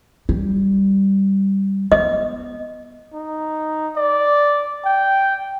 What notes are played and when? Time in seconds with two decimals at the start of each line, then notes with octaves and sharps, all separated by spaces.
0.29 G3
1.92 B3 D#5
3.14 D#4
3.97 D5
4.85 G5